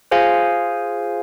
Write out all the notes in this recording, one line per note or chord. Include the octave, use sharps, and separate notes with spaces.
F4 G#4 C5 F5 G#5